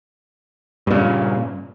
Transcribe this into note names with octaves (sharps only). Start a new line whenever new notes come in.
G2 A#2 C#3